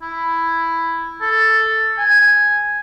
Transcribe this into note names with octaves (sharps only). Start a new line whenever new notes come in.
E4
A4
G#5